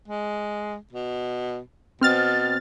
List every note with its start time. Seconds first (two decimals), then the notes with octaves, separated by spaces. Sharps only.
0.08 G#3
0.93 B2
2.01 B2 C4 F6 A6